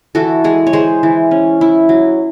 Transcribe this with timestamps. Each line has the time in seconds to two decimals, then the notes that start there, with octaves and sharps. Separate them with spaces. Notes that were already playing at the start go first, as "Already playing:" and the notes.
0.15 E3 F#4 A4
0.44 G#3 G#4
0.67 C#5
0.73 G#3 G#4 C5
1.03 E3
1.31 C#4
1.61 E4
1.89 F#3